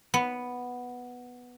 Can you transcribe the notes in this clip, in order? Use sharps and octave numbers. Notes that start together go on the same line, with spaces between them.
B3